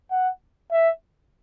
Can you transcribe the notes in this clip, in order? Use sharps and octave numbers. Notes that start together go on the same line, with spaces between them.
F#5
E5